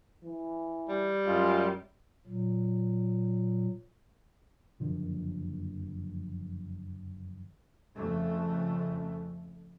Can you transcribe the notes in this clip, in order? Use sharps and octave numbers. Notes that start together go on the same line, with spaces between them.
E3
G3
F#2 G#3 F4
A#2 F#3
F#1 F2 D3 F3
F2 C#3 A3